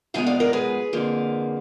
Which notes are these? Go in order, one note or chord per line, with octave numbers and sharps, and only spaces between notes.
G#2 F3 G#3 B3 F5 G#5
D5 F5
A#4 D5
G#4 B4
F2 D3 F3 A#3